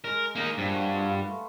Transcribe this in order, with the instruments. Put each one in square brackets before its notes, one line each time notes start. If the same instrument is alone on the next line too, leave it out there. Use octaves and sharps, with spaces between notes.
[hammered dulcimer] G#3 D#5 [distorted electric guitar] A#4
[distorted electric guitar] A#3 D#4
[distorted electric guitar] G2 [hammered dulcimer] F3 A#3
[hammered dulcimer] F#4
F4 B4
A3